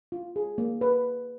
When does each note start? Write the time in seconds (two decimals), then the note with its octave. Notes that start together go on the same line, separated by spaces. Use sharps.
0.12 F4
0.36 G#4
0.58 A#3
0.81 B4